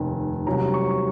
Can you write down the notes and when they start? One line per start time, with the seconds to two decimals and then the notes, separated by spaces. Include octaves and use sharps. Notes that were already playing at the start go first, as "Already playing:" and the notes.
Already playing: F1 D#2 D#3 G#5
0.46 C2 C3 F#3 C#4 A#5
0.74 C#6